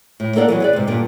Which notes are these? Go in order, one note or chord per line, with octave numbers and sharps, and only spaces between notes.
A2
A#3 A4 A#4 D5 E5 F#5
E3 F#3 B3
G#4 B4 D5
G#2 C3
G2 A#2 D3